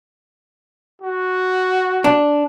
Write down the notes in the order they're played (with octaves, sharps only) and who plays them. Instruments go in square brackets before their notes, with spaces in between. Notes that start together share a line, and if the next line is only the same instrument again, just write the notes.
[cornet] F#4
[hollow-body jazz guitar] D4